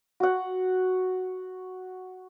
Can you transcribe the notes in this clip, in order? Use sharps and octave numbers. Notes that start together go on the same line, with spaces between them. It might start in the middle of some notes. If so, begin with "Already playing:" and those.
F#4 F#5